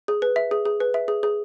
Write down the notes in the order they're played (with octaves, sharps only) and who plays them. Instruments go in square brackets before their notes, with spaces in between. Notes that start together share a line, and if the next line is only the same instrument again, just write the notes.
[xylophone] G#4
B4
E5
G#4
G#4
B4
E5
G#4
G#4